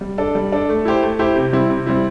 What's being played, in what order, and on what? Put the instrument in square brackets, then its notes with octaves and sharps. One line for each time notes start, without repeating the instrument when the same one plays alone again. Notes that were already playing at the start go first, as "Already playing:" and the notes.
[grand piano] G3
D4 A4
G3
D4 A4
A3
E4 G4 C5
A3
E4 G4 C5
C3
G3 C4 E4
C3
G3 C4 E4